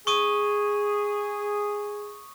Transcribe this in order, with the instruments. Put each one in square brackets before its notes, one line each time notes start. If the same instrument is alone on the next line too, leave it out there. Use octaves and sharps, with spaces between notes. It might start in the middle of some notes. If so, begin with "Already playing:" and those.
[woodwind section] G#4 [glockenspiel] C#6 D#6 D#7